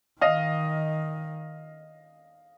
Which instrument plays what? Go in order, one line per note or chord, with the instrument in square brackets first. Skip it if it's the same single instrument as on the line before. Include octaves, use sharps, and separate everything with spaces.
[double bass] D#3 [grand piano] D#5 F5